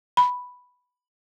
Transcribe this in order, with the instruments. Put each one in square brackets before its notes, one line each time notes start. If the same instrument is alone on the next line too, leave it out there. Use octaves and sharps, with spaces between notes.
[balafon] B5